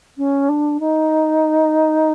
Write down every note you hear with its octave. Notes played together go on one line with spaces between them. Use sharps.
C#4
D4
D#4